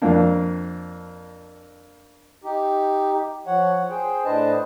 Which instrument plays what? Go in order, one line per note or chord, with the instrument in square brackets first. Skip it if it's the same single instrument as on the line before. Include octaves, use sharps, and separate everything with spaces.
[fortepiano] F2 F3 A#3 D4
[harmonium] D#4 G4
F3 C#5 F#5
G#4 C5 G5
A2 D4 B4 C5 D#5 A5